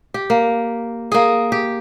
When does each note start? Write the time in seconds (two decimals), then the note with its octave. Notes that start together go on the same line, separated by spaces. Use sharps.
0.14 G4
0.30 A#3
1.12 A#3 G#4
1.52 G4